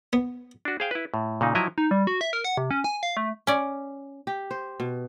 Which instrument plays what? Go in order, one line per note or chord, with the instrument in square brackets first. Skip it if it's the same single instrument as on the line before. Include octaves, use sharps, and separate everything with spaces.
[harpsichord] B3
[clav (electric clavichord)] D4 F#4
G#4 C5 F5 G5
E4 B4
A2
A#2 C#3 D#4
F3 F#3 E4 D#5 G#5 A#5
[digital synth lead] D#4
G3
F#4
E5
A#4
F#5
C3
C#4
G#5
F5
A3
[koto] C#4 D5
[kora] G4
C5
B2